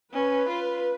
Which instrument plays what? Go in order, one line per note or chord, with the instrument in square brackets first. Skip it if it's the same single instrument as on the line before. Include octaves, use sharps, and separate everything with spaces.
[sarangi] C#4 [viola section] B4
[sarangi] F4